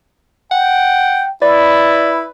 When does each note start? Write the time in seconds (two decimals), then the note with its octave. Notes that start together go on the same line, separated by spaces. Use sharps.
0.51 F#5 G5
1.42 E4 B4 D5